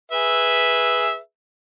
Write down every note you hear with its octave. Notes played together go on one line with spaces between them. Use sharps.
G#4 B4 E5